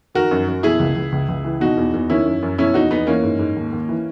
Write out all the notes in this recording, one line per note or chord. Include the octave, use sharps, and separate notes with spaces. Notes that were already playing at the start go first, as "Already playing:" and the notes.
D#3 F#4 A#4
F#2
F#2
B2 E4 G#4
C#2
C#2
C#2
C#2
E3
B2 D#4 F#4
E2
E2
D#3 C#4 E4
F#2
F#2
B2 C#4 E4
E2 D#4 F#4
E2 B3 D#4
E3 A#3 C#4
G#2
G#2
D#2
D#2
E3